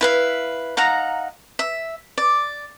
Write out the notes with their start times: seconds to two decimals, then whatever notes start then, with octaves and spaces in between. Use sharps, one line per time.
0.01 E4 B4 F5
0.77 D#4 F5 F#5 A#5
1.59 E5
2.18 D5